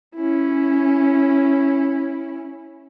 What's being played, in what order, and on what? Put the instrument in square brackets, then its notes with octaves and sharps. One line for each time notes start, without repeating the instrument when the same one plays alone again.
[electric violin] C#4 E4